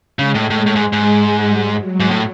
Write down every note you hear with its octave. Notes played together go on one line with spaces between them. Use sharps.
C#3 G#3
A2
A2
A2
G#2
G#2
G3
F#3
G#2
A2